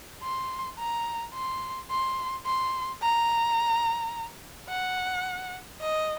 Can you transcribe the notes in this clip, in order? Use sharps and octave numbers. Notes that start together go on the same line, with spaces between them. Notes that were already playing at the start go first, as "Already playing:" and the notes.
C6
A#5
C6
C6
C6
A#5
F#5
D#5